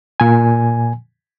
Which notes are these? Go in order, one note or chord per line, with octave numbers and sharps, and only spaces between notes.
A#2 G#5